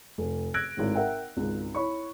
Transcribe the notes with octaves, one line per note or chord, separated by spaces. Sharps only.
F1
E6 F#6 G#6 A#6 D7
G#1 A2
A#4 E5 F#5 G5
G#1 C#2
E4 C#5 B5 C#6